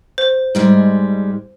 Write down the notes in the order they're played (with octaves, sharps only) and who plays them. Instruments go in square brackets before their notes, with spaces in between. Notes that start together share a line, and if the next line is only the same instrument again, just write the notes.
[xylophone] C5
[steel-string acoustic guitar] G#2 G3 G#3